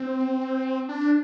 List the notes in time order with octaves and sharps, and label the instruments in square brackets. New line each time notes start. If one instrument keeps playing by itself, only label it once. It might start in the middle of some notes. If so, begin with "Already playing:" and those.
Already playing: [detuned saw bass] C4
D4